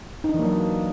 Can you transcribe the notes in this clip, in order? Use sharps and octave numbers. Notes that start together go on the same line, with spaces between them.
D#4
D4
E3
A#3
F#3